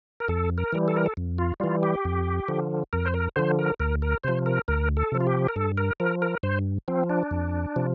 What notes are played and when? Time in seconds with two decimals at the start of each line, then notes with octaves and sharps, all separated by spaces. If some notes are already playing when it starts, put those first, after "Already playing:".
0.20 A#4
0.28 F2 A4
0.58 A#4
0.72 E3 G3
0.88 A4
0.96 A#4
1.06 A4
1.17 F2
1.38 F4
1.60 E3 G3 F4
1.83 G4
2.05 F2
2.48 D3 F3
2.93 F2 A#4
3.06 C5
3.14 A#4
3.36 D3 F3 C5
3.59 A#4
3.80 D2 A#4
4.02 A#4
4.24 C3 F3 C5
4.46 A#4
4.68 D2 A#4
4.97 A4
5.12 C3 F3
5.20 F4
5.27 G4
5.48 A#4
5.56 G2 A4
5.78 A#4
6.00 F3 A#4
6.22 A#4
6.43 G2 C5
6.88 F3 C4
7.10 D4
7.31 F2
7.76 C3 F3